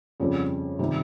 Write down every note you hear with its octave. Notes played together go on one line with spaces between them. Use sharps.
F2 C#3 G3 C4
C3 D#3 G3